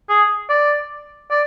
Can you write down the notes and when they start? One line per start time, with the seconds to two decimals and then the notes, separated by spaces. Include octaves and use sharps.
0.09 G#4
0.49 D5
1.30 D5